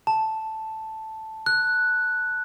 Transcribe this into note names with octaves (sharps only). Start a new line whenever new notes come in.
A5
F#6